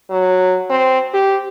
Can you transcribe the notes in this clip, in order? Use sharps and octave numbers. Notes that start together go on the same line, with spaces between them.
F#3
C4
G4